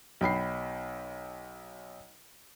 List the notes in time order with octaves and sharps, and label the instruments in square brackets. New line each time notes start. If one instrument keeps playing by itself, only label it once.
[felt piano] B1 G5 B5 C7